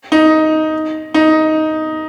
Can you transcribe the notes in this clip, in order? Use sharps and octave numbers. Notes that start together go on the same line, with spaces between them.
D#4
D#4